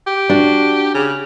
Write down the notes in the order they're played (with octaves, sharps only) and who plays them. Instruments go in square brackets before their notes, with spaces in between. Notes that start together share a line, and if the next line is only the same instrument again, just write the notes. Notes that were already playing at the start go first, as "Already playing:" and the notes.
[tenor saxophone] G4
[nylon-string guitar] D4 F#4
[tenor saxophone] C#3